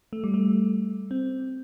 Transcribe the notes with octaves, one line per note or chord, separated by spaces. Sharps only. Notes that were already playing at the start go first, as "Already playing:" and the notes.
A3
G3
A3
C4